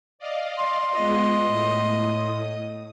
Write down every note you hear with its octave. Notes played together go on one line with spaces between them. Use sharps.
D5 D#5 F5
C6
G#3 B3 F4 D#5
A2 D#6